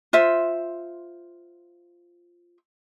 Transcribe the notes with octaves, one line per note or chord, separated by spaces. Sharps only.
F4 C5 E5